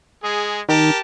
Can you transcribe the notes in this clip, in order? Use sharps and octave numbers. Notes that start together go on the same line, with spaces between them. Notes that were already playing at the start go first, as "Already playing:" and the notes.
G#3 G#4
D#3 G4 A#4 A5